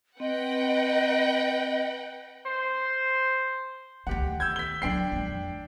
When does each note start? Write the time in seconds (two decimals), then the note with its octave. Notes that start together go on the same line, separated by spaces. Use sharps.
0.20 C4 B4 D#5 F#5 G5
2.46 C5
4.07 D2 D#3 G4 F#5
4.40 E6 G6 G#6
4.56 B6 G7
4.82 D3 F#3 D4 G5 C7
5.12 F2 G#3